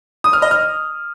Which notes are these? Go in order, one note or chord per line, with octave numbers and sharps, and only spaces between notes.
D#6
F6
D#5
F6